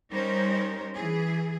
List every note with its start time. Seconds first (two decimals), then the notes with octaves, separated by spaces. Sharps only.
0.11 G3 C#4 D#4 A#4 C5
0.95 E3 G#4